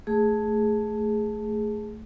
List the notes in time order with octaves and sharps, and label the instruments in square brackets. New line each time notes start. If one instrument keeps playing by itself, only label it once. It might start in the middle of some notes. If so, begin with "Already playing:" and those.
[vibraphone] A3 G#4